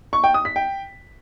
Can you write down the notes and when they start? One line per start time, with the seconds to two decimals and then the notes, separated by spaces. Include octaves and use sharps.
0.13 C#6
0.24 G5
0.34 D#6
0.45 B6
0.56 G5